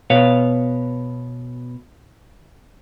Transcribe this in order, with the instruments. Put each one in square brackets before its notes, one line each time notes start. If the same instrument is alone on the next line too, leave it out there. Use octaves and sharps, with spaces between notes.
[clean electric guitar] B2 B4 C#5 F5